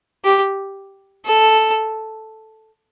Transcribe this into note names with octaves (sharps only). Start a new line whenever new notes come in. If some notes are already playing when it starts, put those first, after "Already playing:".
G4
A4